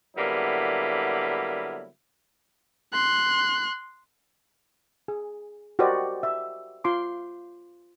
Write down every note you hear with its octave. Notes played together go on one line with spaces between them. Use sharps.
D3 F#3 G3 A#3 B3 E4
C6 F#6
G#4
F#4 G4 A#4 C5 D5 D#5
E5
F4 C6 D6